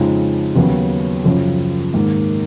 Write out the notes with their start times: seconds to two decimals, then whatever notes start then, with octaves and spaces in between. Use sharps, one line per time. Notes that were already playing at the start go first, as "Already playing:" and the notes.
Already playing: F2 C#3 F3 G#3 D#4
0.55 D#2 C#3 F#3 B3
1.24 F#2 C#3 F3
1.93 G#2 D#3 A#3